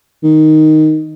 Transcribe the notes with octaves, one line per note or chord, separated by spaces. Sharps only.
D#3